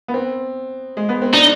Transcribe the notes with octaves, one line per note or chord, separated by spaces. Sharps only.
B3
C4
G#3
B3
C4
D4 D#4